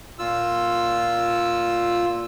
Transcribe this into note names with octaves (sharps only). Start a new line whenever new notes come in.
A#2 F4 E6